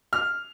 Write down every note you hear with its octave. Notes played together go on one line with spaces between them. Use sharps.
F6